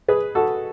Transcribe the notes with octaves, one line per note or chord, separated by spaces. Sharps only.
G#4 B4
F#4 A4